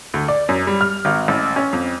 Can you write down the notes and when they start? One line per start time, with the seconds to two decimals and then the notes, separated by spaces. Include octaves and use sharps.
0.14 D2
0.28 D5
0.49 F#2
0.67 G3
0.81 F6
1.05 G#1
1.28 A1
1.56 C#4
1.73 F2